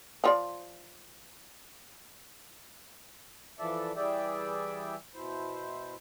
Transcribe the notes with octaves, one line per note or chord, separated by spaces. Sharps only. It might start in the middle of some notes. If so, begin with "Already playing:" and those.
F3 F4 D5
E3 F3 A4 D5 E5
E3 G3 G#4 D5 E5 G5
B2 E4 C5